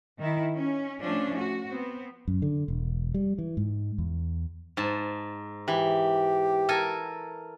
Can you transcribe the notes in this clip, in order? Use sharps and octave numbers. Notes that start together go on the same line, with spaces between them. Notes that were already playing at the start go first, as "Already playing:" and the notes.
D#3 E4
C#4
F3 A3 C#4 D4
F#4
B3 C4
F#2
D3
E1
G3
E3
G#2
E2
G#2 A5
E3 G4
A4 A#4 G#5